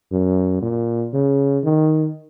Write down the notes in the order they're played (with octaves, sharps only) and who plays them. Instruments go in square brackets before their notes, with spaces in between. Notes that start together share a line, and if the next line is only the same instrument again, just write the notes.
[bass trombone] F#2
A#2
C#3
D#3